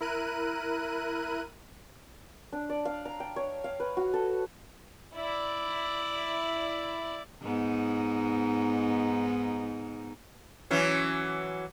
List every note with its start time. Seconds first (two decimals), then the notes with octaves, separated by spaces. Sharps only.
0.01 E4 A#4 F#6 D#7
2.53 D4
2.70 D5
2.85 F5
3.05 A#5
3.20 G5
3.36 C#5
3.64 F5
3.80 B4
3.97 F#4
4.14 A4
5.14 E4 D5
7.42 G#2 B3 D#4
10.71 E3 F#3 C#4